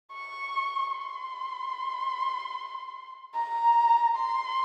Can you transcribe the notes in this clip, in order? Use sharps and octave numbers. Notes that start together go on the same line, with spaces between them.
C#6
C6
A#5
C6